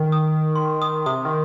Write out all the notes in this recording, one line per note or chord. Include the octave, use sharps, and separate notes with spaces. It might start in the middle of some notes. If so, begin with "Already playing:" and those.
Already playing: D#3
D#6
C6
D#6
C3 D#6
D#3